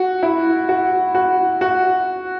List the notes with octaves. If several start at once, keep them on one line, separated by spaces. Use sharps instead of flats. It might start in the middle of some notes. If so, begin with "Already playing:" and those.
Already playing: F#4
E4
F#4
F#4
F#4